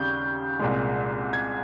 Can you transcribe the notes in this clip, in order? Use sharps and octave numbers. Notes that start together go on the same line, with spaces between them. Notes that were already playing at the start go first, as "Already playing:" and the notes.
Already playing: D#2 C#3 G3 G6
C2 A#2 G#3
G#6